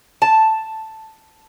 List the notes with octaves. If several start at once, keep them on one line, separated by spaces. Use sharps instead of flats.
A5